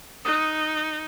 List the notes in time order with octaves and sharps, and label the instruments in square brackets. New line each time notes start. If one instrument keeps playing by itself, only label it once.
[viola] D#4 [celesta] D#6 F#6 D#7